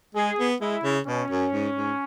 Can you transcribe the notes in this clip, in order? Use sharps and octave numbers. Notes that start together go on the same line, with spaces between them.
G#3 G#4
B3
G#3 E4
C#3
B2 C#4
F#2
G#2
G#2